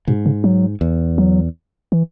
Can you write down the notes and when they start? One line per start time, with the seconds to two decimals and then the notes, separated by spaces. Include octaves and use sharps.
0.08 G#2 B2
0.26 C#3
0.44 F#3
0.81 E2
1.18 F#3
1.92 E3